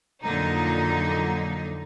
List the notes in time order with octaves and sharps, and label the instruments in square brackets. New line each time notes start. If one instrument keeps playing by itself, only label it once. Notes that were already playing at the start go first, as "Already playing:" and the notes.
[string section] F2 A#2 D3 F#3 D#4